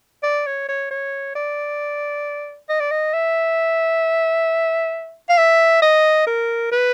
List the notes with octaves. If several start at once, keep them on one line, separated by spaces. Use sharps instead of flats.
D5
C#5
C#5
C#5
D5
D#5
D5
D#5
E5
F5
E5
D#5
A#4
B4